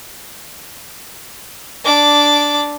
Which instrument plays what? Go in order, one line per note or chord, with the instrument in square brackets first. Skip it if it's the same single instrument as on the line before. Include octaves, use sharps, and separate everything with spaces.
[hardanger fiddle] D4 D6